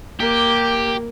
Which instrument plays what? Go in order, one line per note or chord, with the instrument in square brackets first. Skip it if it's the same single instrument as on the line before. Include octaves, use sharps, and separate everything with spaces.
[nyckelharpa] A#3 [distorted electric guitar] G4